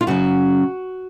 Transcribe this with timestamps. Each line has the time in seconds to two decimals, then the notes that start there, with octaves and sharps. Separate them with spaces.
0.01 F4
0.07 F#2 C#3 F#3 F#4